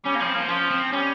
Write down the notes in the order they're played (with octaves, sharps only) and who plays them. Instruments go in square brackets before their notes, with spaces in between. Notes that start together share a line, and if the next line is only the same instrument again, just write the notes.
[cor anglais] G3 [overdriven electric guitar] C#4
[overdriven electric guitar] A#3
[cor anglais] F3 [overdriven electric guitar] C4
[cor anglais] F3 [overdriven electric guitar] A#3
[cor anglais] F3 [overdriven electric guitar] C#4
[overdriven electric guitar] C4
[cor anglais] G3 [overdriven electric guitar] C#4